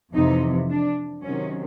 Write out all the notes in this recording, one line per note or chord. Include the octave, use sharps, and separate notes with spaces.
F2 C3 E3 D#4
D4
C3 D#3 F#3 C#4